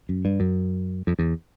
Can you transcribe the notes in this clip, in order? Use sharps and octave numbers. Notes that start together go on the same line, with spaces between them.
F#2
G2
F#2
F2
E2